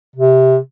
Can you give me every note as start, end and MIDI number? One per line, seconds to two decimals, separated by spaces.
0.16 0.57 48